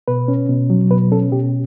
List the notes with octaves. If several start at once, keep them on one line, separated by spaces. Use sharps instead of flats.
B2 B4
C#4
B2
F#3
B2 B4
C#4 A4
B2 G4